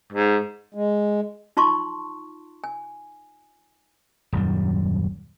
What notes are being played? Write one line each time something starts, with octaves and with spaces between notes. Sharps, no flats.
G#2
G#3
D#4 F4 A5 C6 C#6
G#5
D#1 F#2 G3